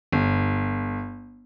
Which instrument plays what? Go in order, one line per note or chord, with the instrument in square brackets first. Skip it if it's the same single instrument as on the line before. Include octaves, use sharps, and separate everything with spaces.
[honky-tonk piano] G1